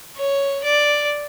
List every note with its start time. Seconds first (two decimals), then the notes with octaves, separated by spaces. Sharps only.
0.17 C#5
0.65 D5